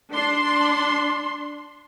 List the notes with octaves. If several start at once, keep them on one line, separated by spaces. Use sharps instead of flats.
D4 C6